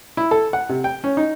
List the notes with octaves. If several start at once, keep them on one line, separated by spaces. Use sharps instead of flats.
E4
A4
F#5
C3
G5
C#4
D#4